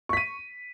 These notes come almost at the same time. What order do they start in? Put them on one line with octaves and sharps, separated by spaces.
C#6 B6 D#7